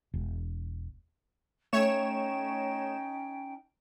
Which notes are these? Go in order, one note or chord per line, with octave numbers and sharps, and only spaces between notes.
E1
A3 C#4 D#4 C#5 G5 E7